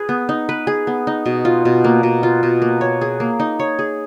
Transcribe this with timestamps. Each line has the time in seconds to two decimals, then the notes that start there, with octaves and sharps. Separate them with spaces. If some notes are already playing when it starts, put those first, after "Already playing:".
Already playing: G#4 B4
0.09 B3
0.29 D#4
0.49 B4
0.67 G#4
0.87 B3
1.07 D#4
1.26 B2
1.45 F4
1.65 B2
1.84 A#3
2.03 B2
2.23 F4
2.43 B2
2.62 A#3
2.81 C#5
3.01 G#4
3.20 A#3
3.40 D#4
3.59 C#5
3.79 G#4